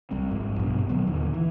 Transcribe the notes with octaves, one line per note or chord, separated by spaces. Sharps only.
C2 G3 C4
G#1 F2 G#2
A#1 G2 B2
B2 D3 F#3 B3
D#2 A#2 D3 D#3
E3